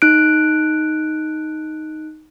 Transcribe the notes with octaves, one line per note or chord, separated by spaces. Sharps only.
D#4 F#6 D7